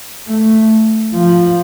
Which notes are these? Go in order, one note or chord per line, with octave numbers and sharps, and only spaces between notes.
A3
F3